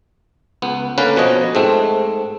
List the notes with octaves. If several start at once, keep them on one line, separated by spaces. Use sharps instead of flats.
C#2 B3
D3 A#3 C#4 B4
B2 F3 C#5 D#5
G#2 A3 C4